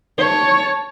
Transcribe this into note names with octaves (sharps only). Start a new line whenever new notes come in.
C#5 A5